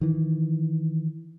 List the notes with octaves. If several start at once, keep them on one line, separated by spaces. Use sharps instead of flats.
D#3 E3